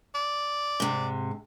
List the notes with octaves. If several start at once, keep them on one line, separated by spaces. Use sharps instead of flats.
D5
G#2 C3